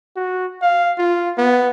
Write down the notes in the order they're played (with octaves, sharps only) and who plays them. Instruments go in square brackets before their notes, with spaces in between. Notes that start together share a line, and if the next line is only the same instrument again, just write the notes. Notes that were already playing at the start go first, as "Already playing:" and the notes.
[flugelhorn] F#4
F5
F4
B3